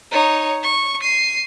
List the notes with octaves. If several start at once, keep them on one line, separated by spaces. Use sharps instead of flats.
D#4 C#5
C#6
C7 D#7